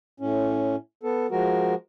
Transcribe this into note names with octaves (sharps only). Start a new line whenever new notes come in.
A2 C#4
B3 A4
F3 G#3 F#4 A#4